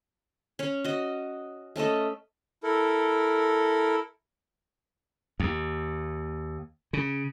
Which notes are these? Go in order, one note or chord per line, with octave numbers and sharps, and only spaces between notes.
C#4 C#5
F#4 D#5
A3 C#4 A4 D#5
E4 A4 A#4
D#2
C#3